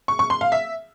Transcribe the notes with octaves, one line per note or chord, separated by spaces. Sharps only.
C#6
C#6
C6
F5
E5